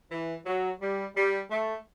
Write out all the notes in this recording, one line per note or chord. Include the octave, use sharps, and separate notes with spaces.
E3
F#3
G3
G3
A3